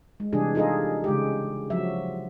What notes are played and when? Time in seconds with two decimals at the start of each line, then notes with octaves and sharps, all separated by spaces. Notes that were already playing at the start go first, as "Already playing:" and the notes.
0.20 G#3
0.33 C3 E3 G3 D4 G#4
0.55 D#4 F4 G#4 A4 D#5
1.04 C#3 G#3 G4
1.70 F3 F#3 E5